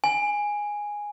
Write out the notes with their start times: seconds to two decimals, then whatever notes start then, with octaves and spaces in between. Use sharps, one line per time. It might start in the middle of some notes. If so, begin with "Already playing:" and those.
0.04 G#5